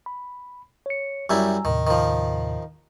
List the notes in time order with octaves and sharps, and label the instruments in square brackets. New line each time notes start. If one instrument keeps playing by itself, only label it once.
[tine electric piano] B5
C#5 C#7
[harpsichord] F#2 G3 E4 [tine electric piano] G#5 A#5 E6
[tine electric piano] D#2 A2 C3 [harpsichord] D#3
[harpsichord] D#3 F3